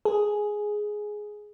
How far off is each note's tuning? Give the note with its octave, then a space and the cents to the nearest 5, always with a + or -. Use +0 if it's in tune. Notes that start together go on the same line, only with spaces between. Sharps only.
G#4 +5